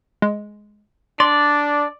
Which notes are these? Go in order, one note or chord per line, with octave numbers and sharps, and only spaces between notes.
G#3
D4 D5 C6